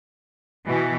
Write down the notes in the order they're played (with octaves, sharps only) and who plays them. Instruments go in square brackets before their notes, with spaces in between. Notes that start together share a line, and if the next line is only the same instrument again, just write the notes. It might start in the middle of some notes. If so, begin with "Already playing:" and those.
[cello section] B2 E3